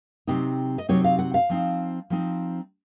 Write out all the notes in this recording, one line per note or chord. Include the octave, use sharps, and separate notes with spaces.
C3 F#3 C4 D#4
D#5
C3 F#3 C4 D#4 C#5
F5
F#5
F5
F3 C4 D#4
F3 C4 D#4